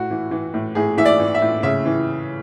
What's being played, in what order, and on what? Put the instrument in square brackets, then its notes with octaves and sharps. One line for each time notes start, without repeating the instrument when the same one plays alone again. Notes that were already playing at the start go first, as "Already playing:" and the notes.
Already playing: [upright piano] A2 F#4
E3
E3
A2
A2 G#4
E3 E5
D5
E3
E5
A2
C#3 E5
E3